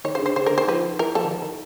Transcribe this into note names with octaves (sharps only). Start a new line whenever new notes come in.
D#3 C#5
C#3 C5
D3
C5
C#3 C5
D3 A#4
D#3 C5
F3 B4
E3 A#4
F3 A4
D#3
E3
D#3